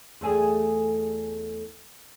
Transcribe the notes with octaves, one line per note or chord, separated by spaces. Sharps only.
E2 A3 G#4